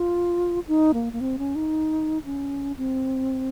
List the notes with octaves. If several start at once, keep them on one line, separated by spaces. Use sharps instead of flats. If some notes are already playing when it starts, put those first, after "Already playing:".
Already playing: F4
D#4
A#3
A#3
C4
C#4
D#4
C#4
C4